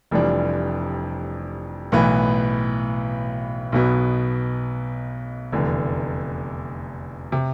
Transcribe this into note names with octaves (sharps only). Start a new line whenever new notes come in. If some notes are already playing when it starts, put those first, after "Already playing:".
F1 F2 E3 G3 D4
B1 A2 E3 B3
B1 B2 B3
F1 E2 D3
C3